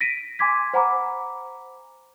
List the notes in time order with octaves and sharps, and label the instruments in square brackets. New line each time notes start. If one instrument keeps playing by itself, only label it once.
[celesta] A#6 B6 D7 D#7
G#5 C6 D6 G#6 B6
C5 F#5 G#5 A#5 B5 D6